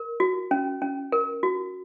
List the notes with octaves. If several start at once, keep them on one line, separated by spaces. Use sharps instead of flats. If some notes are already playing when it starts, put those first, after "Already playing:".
Already playing: A#4
F#4
C#4
C#4
A#4
F#4